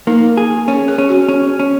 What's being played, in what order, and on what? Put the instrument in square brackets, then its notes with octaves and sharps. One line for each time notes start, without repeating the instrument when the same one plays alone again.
[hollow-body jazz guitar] A#3 [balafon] D#4
[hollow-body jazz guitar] G#4
[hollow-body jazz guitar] C#4 [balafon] A#4
[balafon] G#4
[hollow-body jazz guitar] C#4
[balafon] F#4
[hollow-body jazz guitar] C#4
C#4